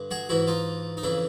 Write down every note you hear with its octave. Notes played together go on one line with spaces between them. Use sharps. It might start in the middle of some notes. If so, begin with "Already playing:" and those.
Already playing: G2 D3
F#4 G#4
G#2 E3 E4 F#4
D#4 F4
D#4
F2 C#3 E3 D4 E4